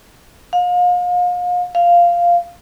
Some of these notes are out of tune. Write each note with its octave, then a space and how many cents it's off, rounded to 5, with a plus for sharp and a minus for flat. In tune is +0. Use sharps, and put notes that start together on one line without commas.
F5 +35
F5 -5